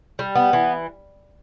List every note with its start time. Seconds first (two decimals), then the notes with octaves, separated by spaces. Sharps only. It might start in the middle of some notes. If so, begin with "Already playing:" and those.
0.19 G3
0.35 B3
0.53 E3